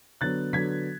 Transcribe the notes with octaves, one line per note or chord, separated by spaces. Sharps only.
D3 F#3 B3 F#6 A6
D3 F#3 B3 G#6 B6